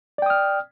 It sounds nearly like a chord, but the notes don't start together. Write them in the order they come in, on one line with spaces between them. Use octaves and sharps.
D5 G5 D#6 F6